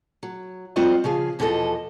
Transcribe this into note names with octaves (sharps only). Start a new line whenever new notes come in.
F#3
G3 C4 F4 F#4 C5 D#5
C#3 F3 G#4 F5
E2 B2 E3 F3 A4 D#5